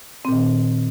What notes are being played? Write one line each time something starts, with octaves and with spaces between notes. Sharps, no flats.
A#2 D#3 C4